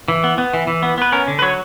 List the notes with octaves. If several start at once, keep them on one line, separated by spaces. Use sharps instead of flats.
E3
B3
B3
E3
E3
B3
B3 B4
C#4 A#4
D3
B4
F#3 C#5